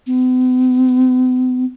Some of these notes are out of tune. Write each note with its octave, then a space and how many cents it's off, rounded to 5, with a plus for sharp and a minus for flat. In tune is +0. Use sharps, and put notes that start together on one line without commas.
B3 +45